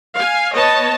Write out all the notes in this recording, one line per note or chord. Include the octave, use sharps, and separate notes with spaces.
F5 G#5
B3 C#5 D#5 A5